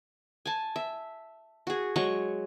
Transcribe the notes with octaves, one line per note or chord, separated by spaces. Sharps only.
G#5 A5
E5
F#4 G#4
F#3 G#3 C#6